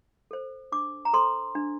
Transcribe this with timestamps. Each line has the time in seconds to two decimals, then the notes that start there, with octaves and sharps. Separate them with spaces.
0.31 A4 C5
0.72 D4 D6
1.05 A#5
1.13 A4 C5 C6
1.55 D4